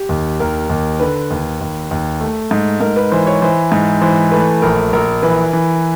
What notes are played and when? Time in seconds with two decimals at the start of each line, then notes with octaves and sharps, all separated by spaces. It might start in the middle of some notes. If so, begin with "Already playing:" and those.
Already playing: G4
0.09 D#2
0.40 D#2 A#4
0.70 D#2
1.00 D3 B4
1.31 D#2
1.61 D#2
1.91 D#2
2.21 A3
2.51 G#2
2.81 G#2 A#4
2.96 B4
3.11 E3 C5
3.27 C#5
3.42 E3 C5
3.72 G#2
4.01 E3 C5
4.31 A3 B4
4.62 A#1 A#4
4.93 A#1 A#4
5.22 E3 B4
5.53 E3